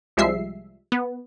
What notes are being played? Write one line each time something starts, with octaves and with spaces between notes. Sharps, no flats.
C2 F3 G3 G#3 E5 C7
B3